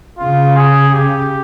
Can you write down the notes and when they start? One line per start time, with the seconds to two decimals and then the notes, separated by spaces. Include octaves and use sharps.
0.19 C#3 F4
0.56 G#4
0.93 G4